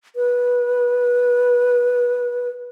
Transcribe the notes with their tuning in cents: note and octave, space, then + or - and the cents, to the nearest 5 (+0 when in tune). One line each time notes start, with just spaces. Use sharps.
B4 -20